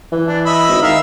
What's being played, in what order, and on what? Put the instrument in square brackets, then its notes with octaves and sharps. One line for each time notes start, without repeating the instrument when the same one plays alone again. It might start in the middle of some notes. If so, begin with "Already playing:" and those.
[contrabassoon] E3
[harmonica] D4
D#5 E5 B5
[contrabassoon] G#1
[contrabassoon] D#3 [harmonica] E5 F5 A#5